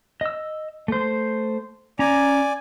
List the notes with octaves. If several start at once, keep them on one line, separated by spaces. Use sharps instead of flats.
D#5 E6
A3 C5
C#4 D5 G#5 A#5